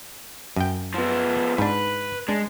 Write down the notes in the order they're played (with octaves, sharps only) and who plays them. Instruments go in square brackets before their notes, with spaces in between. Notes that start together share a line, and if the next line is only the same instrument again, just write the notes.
[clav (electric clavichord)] F#2 G5
[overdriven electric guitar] F3 B3
[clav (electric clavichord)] G#2 D4 [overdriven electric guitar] B4
[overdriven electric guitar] G#3 [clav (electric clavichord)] D4